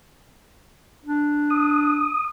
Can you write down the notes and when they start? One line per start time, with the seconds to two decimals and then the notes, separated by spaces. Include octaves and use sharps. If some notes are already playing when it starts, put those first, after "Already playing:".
1.05 D4
1.50 D#6